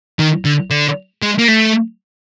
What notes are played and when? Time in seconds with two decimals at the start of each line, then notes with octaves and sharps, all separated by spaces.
0.19 D#3
0.45 D3
0.71 D3
1.23 G#3
1.38 A#3
1.48 A3